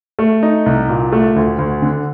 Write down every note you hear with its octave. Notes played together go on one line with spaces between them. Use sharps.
A3
D#4
C2
A#2
A3
D2
D2
D3